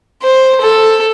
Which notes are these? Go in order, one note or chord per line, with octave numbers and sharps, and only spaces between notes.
C5
A4